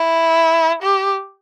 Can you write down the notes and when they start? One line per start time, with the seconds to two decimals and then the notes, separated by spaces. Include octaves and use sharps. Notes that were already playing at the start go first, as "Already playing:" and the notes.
Already playing: E4
0.82 G4